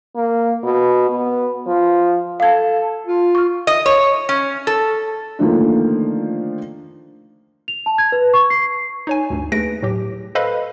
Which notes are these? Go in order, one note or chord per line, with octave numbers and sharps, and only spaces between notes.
A#3
B2
B3
F3
A4 F5 G#6
F4
C#6 F6
D#5
C#5
C#4
A4
D3 D#3 F3 A3 A#3
F7
A5
G#6
B4
C#6
C7
C7
D#4 C#5 G#5
D2 G2
D#2 A3 G#4 B4 A#6 D7
A2 F#3 G4
A4 B4 C5 D#5 F5 B5